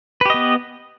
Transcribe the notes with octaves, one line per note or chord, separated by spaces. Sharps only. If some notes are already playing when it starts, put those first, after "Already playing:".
B3 G4 B4 D#5